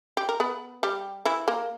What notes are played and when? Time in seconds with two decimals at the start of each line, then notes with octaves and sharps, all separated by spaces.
0.17 G4
0.29 A#4
0.40 B3 B4
0.83 G3 G4
1.25 E3 E4
1.48 A#3 A#4